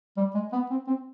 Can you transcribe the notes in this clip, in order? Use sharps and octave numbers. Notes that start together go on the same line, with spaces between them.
G3
G#3
B3
C4
C4